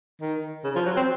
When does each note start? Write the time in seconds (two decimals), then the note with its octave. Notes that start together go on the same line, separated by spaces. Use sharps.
0.21 D#3
0.64 C#3
0.76 F3
0.86 F#3
0.97 C4